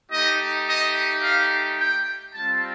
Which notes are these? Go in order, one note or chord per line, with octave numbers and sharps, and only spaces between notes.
A3 D#4 G4 D#5
D#5
F5
G5
G3 C4 F4 A5